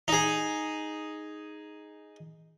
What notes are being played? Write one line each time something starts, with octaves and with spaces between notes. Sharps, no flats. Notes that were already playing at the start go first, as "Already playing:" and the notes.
D#4 G#4